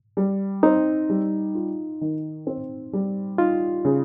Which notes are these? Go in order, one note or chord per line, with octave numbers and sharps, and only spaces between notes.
G3
C4 D#4
G3
F4
D#3
C4
G3
D#4 F4
C#3